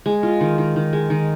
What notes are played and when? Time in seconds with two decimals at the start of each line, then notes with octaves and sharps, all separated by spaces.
0.06 G#3
0.23 F4
0.41 D#3
0.58 D#3
0.76 D#3
0.93 G#3
1.10 D#3